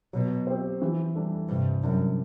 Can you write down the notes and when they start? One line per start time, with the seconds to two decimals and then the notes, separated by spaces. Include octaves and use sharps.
0.13 B2 F#3
0.47 C4 G4 C5
0.82 E3
1.15 G3 D4 A4
1.49 G2 C3
1.83 F#2 G3 D4